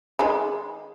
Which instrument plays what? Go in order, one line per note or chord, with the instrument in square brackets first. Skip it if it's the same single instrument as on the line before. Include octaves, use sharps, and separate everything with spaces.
[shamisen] D#3 G#3 B5